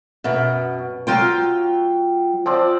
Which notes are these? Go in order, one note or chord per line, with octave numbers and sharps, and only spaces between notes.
F#2 B2
F#3 F4 G5
F3 C4 D5